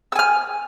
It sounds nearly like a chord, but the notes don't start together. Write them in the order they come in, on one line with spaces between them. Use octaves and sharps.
E6 G#5 F6